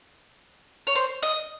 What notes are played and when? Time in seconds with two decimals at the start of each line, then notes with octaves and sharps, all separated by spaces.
0.87 C#5
0.95 C5
1.23 D#5